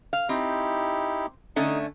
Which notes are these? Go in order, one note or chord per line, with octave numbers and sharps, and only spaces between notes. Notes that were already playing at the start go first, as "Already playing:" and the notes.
F5
C4 D#4 E4 G4
D3 A3 C#4 D#4